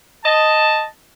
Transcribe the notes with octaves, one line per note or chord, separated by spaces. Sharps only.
D#5 A5